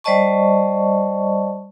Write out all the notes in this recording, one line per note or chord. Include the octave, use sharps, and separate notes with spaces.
G3 C5 D5 D#5 A5 C#6